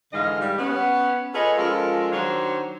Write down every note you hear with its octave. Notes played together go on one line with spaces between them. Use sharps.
G#2 D3 E3 G#3 D#5 F5
G3
B3 C#4
F4 G#4 A4 B4 C#5 D#5
F3 G#3 C#4 F4 A4 A#4
D#3 F#3 D4 C5 C#5